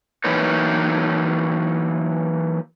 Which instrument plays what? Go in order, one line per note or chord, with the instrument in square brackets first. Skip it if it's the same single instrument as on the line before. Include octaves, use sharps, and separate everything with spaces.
[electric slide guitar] E3 F#3 A#3 D#4 B4 C#5